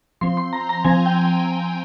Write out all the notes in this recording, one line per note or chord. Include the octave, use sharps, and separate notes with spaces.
F3 C4 C6
C6
A#5
A#5
F3 C4 G#5
G5